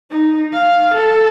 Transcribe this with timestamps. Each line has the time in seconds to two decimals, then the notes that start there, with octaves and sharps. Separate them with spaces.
0.11 D#4
0.53 F5
0.95 A4